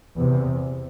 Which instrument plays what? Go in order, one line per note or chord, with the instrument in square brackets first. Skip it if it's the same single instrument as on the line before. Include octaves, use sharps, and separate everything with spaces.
[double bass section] E2 C3